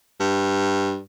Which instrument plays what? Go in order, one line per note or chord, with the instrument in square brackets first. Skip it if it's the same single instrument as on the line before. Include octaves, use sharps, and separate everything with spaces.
[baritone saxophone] G2